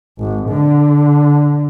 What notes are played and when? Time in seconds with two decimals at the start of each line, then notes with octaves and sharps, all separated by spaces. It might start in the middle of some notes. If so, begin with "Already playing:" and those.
0.19 G#1
0.49 D3